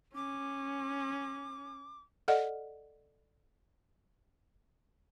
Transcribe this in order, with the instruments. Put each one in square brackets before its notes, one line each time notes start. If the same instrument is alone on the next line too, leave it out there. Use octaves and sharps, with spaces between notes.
[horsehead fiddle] C#4 [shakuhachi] D6
[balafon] A4 D5 D#5 F#5